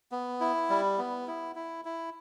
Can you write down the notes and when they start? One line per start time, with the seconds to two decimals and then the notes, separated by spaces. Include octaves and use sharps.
0.12 B3
0.41 E4
0.70 G3
0.98 B3
1.27 E4
1.56 E4
1.85 E4